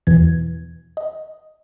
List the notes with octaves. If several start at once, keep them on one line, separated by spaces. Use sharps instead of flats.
E2 B2 E3 G#6
D#5